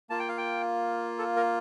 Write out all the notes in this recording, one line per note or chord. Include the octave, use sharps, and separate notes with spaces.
A#3 F4 A5
G5
F5
G5
A4
A#4